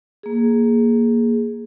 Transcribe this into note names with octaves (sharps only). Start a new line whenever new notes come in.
A#3 G#4